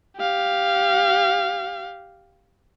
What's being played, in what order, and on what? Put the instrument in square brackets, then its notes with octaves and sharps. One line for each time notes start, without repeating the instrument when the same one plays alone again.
[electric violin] G4 F5